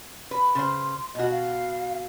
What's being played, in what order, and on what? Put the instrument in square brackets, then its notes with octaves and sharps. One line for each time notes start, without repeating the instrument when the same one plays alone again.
[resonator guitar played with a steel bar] B4
[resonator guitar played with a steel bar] C#3 C5 [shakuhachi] C6
[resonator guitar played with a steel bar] B2 F#4 [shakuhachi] D#5
[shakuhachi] F5